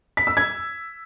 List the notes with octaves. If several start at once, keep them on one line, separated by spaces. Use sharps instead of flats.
B6
E6
G#6